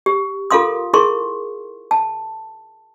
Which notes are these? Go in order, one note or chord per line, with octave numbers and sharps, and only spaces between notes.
G4
F4 A4 A#4 F5 C6 D#6
E4 G#4 A#4 C6 C#6
A5